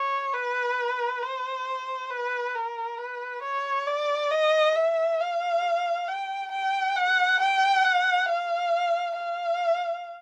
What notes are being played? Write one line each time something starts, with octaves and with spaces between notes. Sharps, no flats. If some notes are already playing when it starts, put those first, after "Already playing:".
Already playing: C#5
B4
C5
B4
A#4
B4
C#5
D5
D#5
E5
F5
G5
G5
F#5
G5
F#5
F5
F5